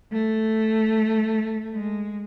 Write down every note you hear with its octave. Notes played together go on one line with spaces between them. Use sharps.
A3
G#3